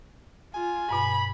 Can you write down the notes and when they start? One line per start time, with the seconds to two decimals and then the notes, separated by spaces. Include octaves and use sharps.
0.54 F4 G#5
0.90 G2 B2 B5